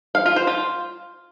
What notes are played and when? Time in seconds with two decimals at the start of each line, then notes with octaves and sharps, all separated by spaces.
0.15 F5
0.26 F4
0.36 C5
0.47 F4